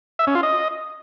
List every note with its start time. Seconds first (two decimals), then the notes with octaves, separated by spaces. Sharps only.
0.19 E5
0.27 C#4
0.35 F4
0.43 D#5